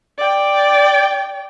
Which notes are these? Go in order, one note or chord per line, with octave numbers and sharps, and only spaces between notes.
D5 G5